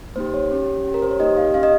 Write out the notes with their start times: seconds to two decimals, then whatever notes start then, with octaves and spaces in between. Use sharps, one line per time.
0.16 A#3 D#4 G4 C5
0.34 C#5
0.51 C#4 G4
0.85 C#4 G4
0.94 A#4
1.02 C5
1.11 C#5
1.20 A#3 D#4 G4 D#5
1.37 F5
1.54 C#4 G4 F5
1.63 D#5